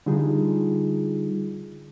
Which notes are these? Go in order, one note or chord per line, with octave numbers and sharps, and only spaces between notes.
D3 G3 D#4 F4 G#4